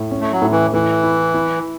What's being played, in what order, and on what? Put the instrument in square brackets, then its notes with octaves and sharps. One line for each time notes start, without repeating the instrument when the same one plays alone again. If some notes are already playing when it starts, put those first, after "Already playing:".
Already playing: [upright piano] A2
C#4
[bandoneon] A3
F#3
[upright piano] A2
[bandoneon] E3
[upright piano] A2 [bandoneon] E3
[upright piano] E4
E4